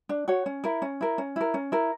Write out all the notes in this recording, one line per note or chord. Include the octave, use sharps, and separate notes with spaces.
D4
F#4 C#5
C#4
E4 A#4
C#4
E4 A#4
C#4
E4 A#4
C#4
E4 A#4